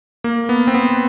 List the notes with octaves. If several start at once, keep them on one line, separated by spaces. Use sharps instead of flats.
A#3
B3
C4
B3